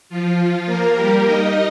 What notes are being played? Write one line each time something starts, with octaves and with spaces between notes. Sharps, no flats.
F3 F4
A#3 A#4
G3 G4
D#4 D#5